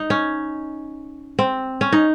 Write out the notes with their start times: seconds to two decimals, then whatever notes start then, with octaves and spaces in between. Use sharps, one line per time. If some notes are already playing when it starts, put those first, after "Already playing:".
Already playing: D#4
0.10 C#4
1.39 C4
1.81 C#4
1.92 D#4